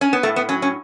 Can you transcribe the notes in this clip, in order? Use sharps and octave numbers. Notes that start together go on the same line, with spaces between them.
C#4
B3
A2 A3
B3
F#3 C#4
C#4